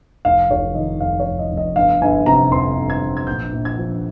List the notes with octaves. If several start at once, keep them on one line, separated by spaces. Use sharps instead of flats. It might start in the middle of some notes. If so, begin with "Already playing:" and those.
F1 F5
F1 C#5
D#3 D#5
F2 F5
C#5
F1
D#5
F1
D#5
G1 F5
G1 G#5
C3 A#5
F2 C6
G1
G#6
G1
G#6
A#1 G6
A#1
G#6
F3